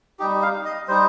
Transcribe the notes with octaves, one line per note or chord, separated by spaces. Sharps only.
G3 D#4 G4
F5
D#5
G3 D#4 C5